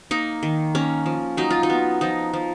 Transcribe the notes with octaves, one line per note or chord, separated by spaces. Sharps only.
A#3 D#4
D#3
A#3 C#4
F3
F#3 D#4
F4
D#4
B3
F3 D#4
F3